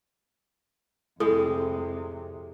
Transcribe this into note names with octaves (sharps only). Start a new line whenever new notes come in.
F2 A2 C3 G#3 A4 D#6